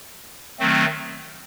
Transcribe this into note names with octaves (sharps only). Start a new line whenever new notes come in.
D#3 F#3 A3 C4